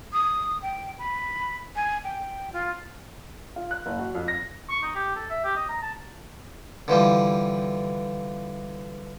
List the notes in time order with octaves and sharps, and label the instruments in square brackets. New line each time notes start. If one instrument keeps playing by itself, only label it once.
[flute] D#6
G5
B5
G#5
G5
F4
[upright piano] F4
F#6
F#1
F#4
F2
A#6
[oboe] C#6
D#4
G4
A4
E5
G4
D#5
A#5
A5
[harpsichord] D3 E3 F3 G3